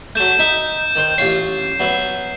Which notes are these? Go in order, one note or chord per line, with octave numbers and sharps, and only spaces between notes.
F#3 A3 G6 E7
D#4 E5
D#3 C5
A1 F4 C#5 C7
F#3 B3 E5